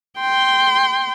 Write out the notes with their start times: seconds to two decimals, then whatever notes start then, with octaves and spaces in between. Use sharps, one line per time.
0.20 G5 C6